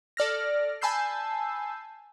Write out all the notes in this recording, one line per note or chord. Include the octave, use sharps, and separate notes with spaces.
A4 D5 F6 A#6
G#5 A5 B5 E6 G6 C7